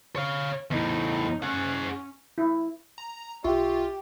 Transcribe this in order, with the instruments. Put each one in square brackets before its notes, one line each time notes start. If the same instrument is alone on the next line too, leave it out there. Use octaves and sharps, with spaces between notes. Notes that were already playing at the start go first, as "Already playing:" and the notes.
[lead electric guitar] C#5 F5
[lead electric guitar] E2 A2 [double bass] D#4
[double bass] C#4 [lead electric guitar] G#4 F#5
[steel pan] E4
[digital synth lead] A#5
[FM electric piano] B1 E5 C#6 [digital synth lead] F4 [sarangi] G4